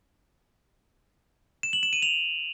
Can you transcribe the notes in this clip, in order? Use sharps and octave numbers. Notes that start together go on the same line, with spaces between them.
E7
F#7
E7
D#7
F7